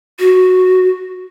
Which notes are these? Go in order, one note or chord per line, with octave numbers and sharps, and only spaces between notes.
F#4